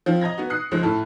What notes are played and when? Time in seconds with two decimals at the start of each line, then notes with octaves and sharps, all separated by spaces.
0.06 F3 C4 F4
0.21 D#5 A#5 G#6 A#6
0.38 B3 F#4
0.50 D#6 F#6 C7 C#7
0.71 C#2 F3 G#3
0.83 A2 E4 A4 F6